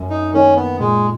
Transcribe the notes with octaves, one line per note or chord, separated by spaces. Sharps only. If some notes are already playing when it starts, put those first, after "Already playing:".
Already playing: F#2
D#4
D#3 A#3 C#4 D#4
B3
A#2 G#3